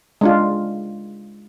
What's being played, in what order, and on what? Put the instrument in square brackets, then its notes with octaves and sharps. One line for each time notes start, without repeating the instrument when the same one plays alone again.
[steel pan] G#3 D4 F4